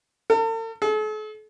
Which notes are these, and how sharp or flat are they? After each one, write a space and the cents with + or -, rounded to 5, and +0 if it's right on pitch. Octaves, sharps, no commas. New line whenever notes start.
A4 +45
A4 -45